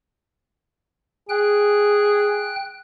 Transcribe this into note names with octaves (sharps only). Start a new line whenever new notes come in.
G#4 G5 F#6